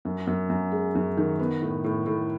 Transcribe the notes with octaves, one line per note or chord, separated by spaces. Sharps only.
F#2
F#2
F#2
G#3
F#2
D#3
B3
A2
A2
A2